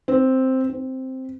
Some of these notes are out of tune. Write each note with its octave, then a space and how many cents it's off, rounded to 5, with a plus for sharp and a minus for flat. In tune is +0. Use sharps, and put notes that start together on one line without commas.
C4 +0
C4 +0